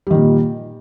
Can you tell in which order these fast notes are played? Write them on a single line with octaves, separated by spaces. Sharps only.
G3 D#3 A#2